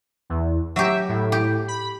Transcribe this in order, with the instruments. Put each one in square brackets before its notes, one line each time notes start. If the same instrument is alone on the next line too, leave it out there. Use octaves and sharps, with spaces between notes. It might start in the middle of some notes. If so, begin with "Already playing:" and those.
[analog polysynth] E2
[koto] F#3 G4 [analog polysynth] E5
[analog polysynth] A2
[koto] G4
[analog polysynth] B5